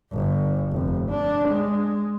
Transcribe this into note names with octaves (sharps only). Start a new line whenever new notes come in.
G1
F1
D4
G#3